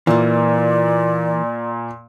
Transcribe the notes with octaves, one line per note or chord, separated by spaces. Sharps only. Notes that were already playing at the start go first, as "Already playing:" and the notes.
A#2 E3 A#3 D5